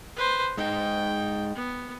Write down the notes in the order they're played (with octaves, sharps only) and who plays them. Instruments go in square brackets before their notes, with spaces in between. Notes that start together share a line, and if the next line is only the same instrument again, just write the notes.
[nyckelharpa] B4 C5
[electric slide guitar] G#3 D#4 [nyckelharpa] G5
[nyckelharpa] B3